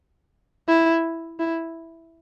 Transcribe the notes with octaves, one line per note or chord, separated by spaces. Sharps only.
E4
E4